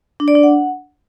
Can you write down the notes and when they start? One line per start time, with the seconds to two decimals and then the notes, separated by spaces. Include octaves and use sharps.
0.20 D4
0.28 D5
0.35 D4
0.43 F#5